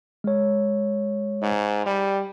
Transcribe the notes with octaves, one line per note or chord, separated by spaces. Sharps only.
G#3 C#5
G#2
G3